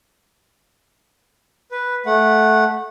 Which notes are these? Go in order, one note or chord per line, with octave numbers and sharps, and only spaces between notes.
B4
A3 F#5